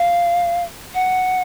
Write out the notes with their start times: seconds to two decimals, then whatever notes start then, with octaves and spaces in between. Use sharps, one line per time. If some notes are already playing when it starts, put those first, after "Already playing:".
Already playing: F5
0.94 F#5